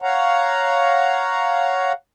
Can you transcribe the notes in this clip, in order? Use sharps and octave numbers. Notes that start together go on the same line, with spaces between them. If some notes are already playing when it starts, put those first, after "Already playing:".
C#5 F5 F#5 A#5